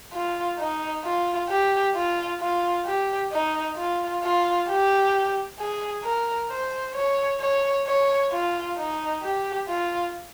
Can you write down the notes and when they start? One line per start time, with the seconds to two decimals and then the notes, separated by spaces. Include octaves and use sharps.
0.13 F4
0.59 D#4
1.04 F4
1.49 G4
1.94 F4
2.41 F4
2.85 G4
3.32 D#4
3.77 F4
4.23 F4
4.68 G4
5.59 G#4
6.04 A#4
6.50 C5
6.95 C#5
7.41 C#5
7.87 C#5
8.31 F4
8.77 D#4
9.22 G4
9.68 F4